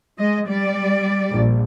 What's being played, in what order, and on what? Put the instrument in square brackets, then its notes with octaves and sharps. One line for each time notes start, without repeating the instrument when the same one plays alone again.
[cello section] G#3 D#5
G3 D5
[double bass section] A#1